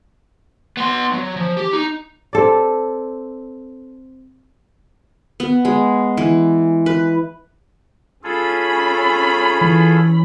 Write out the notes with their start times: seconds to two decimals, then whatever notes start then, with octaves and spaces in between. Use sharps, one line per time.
0.77 B3 C6
1.13 F#3
1.37 F3
1.57 G4
1.73 D#4
2.33 C4 A4 D5
5.40 B3
5.65 G#3
6.17 E3
6.86 B4
8.24 C#4 F4 G#4 A4 B5
9.61 E3